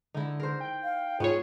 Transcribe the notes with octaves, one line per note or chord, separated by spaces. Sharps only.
D3 D#4 E4
A#4 C5
G5
F5
G#2 B3 C#4 F4 G#4 C#5